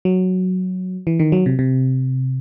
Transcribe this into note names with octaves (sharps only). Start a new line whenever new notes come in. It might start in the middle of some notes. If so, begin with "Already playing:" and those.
F#3
E3
D#3
F#3
C3
C3